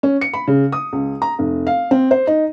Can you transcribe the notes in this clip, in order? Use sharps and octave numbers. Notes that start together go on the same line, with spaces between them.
C#4
C#7
B5
C#3
D#6
C#2
A#5
F1
F5
C4
C5
D#4